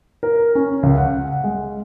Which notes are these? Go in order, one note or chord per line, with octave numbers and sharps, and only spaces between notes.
A#4
C#4
C#2
F#5
G#3